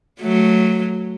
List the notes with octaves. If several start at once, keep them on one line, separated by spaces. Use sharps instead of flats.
F#3 A3